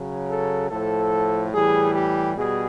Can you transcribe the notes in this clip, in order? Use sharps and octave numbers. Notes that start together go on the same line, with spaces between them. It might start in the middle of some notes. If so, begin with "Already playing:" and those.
Already playing: C#3 F#3
A4
A2 F3 A4
A2 E3 G3 G#4
G4
B2 G3 G#4